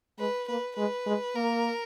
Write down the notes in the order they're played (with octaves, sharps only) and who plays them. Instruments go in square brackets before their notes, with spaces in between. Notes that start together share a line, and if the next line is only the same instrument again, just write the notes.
[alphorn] G#3 [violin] B4
[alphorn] A#3 [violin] B4
[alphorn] G#3 [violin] B4
[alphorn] G#3
[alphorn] A#3 [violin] A#4